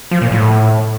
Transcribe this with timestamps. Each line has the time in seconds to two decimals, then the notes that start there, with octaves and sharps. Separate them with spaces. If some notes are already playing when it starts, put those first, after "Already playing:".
0.11 F3
0.22 A#2
0.32 A2